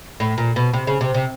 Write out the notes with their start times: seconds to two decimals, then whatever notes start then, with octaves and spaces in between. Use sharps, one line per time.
0.20 A2
0.38 A#2
0.56 B2
0.73 C3
0.87 C#3
1.01 C3
1.14 C3